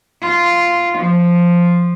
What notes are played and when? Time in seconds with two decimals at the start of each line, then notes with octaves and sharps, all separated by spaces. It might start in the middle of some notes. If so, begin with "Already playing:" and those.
0.22 F4
0.98 F3